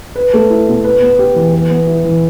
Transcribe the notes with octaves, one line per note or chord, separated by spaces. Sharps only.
B4
A3
E4
B2
B4
B3
G4
E3
B4
B3
E4
E3